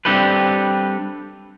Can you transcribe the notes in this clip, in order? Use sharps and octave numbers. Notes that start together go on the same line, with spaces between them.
G3 C4 D4 G4 A4 B4